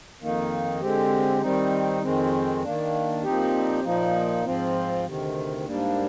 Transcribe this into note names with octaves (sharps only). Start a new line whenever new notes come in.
F2 D#3 A#3 D#4
D3 G#3 C4 G4
D#3 G3 C4 D#4
F2 D#3 G#3 C4
D#3 A#3 D4
A#2 F3 C4 D#4 G4
A#2 F3 A#3 D#4
G#2 F3 C4 F4
D2 C3 D#3
G#2 G3 A#3 D4